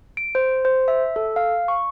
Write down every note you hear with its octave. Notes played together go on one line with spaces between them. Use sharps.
D7
C5
C5
E5
A4
F5
C#6